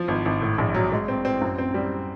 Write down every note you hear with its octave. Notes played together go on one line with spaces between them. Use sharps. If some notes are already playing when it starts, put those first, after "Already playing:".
Already playing: F3
G#1
G#1
A2
A#1
F#3
G#3
C4
C4
F#2
C4
G3